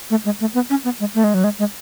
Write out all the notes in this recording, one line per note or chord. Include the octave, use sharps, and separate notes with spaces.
A3
G#3
A3
B3
C#4
B3
G#3
A3
G#3
F#3
G#3
G#3